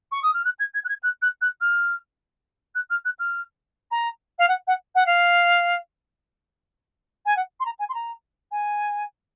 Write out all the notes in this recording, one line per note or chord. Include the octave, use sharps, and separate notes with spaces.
C#6
D#6
F6
F#6
G#6
G#6
F#6
G#6
F#6
F#6
F#6
F6
F#6
F6
F#6
F6
A#5
F5
F#5
F#5
F#5
F5
G#5
F#5
C6
A#5
G#5
C6
A#5
G#5